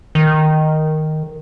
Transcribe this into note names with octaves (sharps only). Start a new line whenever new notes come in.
D#3